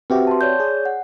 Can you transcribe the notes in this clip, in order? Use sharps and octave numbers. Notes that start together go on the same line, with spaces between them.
C4 F#4 G4 B4 E5
A5 C6
C#5 D5 G6
G#4
F#5